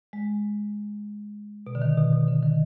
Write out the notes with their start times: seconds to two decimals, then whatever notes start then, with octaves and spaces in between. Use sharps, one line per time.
0.13 G#3
1.67 B2
1.75 D3
1.82 D#3
1.97 B2
2.13 B2
2.28 D3
2.43 D#3